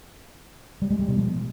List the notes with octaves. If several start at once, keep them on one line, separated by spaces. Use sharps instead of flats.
G3
G#3
G3
B2
F3